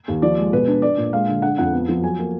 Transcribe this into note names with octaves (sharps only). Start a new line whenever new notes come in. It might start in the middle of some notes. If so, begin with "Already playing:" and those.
D#2
F3 D5
G#3
B2 B4
D4
D4 D5
A#2
G#3 F5
D3
D4 F#5
F2 F#5
B3
F3
F#3 G#5
A#3